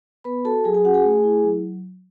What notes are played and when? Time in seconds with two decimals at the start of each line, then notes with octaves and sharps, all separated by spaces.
0.24 B3 B4 B5
0.45 F#4 A4 A5
0.64 F#3 G#4 G#5
0.74 G#4 G#5
0.84 C#4 F#4 F#5
0.94 G#4 G#5
1.04 A3
1.24 E4
1.44 F#3